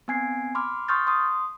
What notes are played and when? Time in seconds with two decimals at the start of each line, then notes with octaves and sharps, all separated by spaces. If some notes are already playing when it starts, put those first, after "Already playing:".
0.08 B3 C4 G#5 G#6 C7
0.55 B5 C6 D6 F6
0.88 C6 C#6 D#6 F6 G6 A6
1.07 C6 D#6